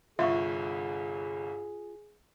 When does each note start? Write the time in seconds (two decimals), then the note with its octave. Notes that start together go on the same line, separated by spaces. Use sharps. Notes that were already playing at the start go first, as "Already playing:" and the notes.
0.19 G1 C2 F4 G#4 E5 C#6